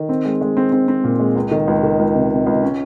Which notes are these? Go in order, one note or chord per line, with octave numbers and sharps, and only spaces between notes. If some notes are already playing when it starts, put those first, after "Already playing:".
Already playing: D#3
C4
G#3
G#3
C4
C4
C4
A#2
G#3
C#2
D#3
C#2
D#3
C#2
C3
C3
C#2
C#4